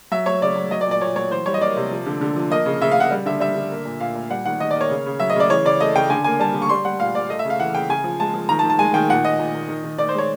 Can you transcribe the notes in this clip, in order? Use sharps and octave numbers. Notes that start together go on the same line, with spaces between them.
F#3 E5
F#3 C#5
C#3 D5
F#3
F#3 D#5
D5
A#2
D5
A#2 C#5
F#3 C#5
E3 C5
G3 C#5
D#5
A#3 D5
C3
F3
D3
D3
F3
A#3 D#5
C#3
C#3 E5
F5
C#3 F#5
G3
D3 E5
G3 E5
D3
A#3
A#2
A#2 F5
A#2
G3 F#5
D#3 F#5
D#3 D#5
D5
A#3
C#5
C#3
C#3
F#3 E5
D#5
C#3 D5
E3 C#5
C#3 D5
A3 D#5
C#3 G5
D3 G#5
A#3 G#5
G3 A5
D3
C#6
G3 C6
G3 F#5
A#2 F5
A#2 D5
A3 D#5
E5
C#3
F5
E3 F#5
C#3 G5
C#3 G#5
F3
G#3 A5
F3
D#3 A#5
A5
D#3
A5
G#3 G#5
D#3 G5
A#2 F#5
A#2 D#5
A#2
A#2
D#3
D#3
D#3 D5
C5
G#3 C#5